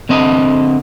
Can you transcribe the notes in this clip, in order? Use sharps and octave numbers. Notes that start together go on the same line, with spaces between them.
D3 C4 D#5